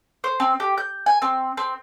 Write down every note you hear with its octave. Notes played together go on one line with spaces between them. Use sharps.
C5
C4
G4
G6
G#5
C4
C4